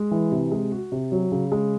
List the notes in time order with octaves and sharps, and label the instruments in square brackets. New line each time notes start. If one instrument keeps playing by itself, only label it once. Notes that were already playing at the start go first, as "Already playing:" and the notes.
Already playing: [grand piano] G#3
E3
C3
G#3
F#4
C3
F#3
C#3
G#3